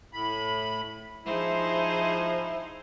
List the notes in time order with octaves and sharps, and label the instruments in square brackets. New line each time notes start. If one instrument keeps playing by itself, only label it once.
[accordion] A2 B5
[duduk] F3 [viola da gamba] D#4 G#4 C5 [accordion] E4